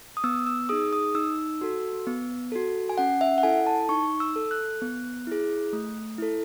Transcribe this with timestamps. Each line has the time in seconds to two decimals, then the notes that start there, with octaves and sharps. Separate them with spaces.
0.17 D#6
0.24 B3 E6
0.47 E6
0.69 D#4 G#4 D#6
0.93 D#6
1.15 D#4 E6
1.61 F#4 A4
2.07 B3
2.52 F#4 A4
2.89 G#5
2.98 C#4 F#5
3.21 E5
3.38 F#5
3.43 E4 A4 G#5
3.67 A5
3.89 D#4 C#6
4.20 E6
4.36 A4
4.51 F#6
4.82 B3
5.27 E4 G#4
5.73 A3
6.18 E4 A4